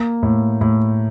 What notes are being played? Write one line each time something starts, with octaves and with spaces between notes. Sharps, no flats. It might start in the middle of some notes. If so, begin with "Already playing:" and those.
Already playing: A#3
A2
A2